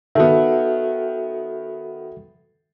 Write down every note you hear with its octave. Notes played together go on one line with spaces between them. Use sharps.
D#3 B3 F#4 A4 E5